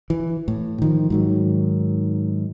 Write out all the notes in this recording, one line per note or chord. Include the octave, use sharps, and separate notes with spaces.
E3
A2
D#3 F3
G#2 D#3 F#3